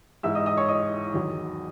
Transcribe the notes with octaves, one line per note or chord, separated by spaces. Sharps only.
G#2 E3 E5 E6
D#5 D#6
D#5 D#6
C#5 C#6
D#5 D#6
E2 D#3 F#3